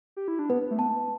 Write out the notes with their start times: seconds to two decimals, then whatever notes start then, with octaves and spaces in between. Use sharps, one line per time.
0.17 G4
0.28 E4
0.39 D4
0.49 B3 B4
0.71 A3
0.78 B3 A5